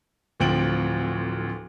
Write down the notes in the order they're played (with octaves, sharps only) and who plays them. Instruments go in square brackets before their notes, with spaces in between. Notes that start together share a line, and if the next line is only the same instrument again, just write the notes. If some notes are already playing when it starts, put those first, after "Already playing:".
[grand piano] D1 D2 F3 C4 D7 F#7